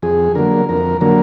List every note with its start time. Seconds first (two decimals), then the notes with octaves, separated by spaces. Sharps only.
0.02 F2 G#4
0.35 D3 F#3 A#3 A#4
0.69 F2 A#4
1.01 D3 F#3 A#3 A#4